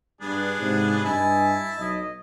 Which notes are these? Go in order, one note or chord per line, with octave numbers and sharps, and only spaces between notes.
G2 B3 D4 G#4
G#2 C3
G2 E4 D#5 E5 G#5 A5
B1 D#5